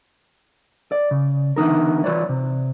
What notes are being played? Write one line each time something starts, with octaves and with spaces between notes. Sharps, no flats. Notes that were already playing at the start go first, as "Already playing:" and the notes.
D5
C#3
D3 E3 B3 D#4 A#4
E3 F4 B4 C#5 D5
C3